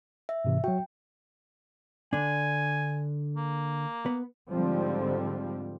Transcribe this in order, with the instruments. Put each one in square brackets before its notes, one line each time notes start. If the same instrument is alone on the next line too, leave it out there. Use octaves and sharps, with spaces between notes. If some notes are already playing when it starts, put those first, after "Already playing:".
[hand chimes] E5
[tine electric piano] G#2 C3 E3
[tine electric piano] F#3 F#4 [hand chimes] G5
[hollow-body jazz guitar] D3 D4 [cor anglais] G#5
[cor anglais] A#3
[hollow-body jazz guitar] B3
[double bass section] G#2 D3 F3 G3 C4